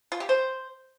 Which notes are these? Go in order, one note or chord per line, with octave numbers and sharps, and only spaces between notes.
F4
G4
C5